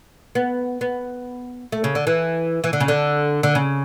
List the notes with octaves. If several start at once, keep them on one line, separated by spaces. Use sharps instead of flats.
B3
B3
A3
C#3
D3
E3
E3
D3
C#3
D3
D3
C#3